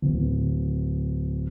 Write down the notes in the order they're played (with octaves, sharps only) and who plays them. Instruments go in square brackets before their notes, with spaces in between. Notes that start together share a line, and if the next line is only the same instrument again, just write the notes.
[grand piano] D1